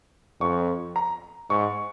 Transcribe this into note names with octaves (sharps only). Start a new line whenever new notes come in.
F2 C#6
A#5
G#2 C#6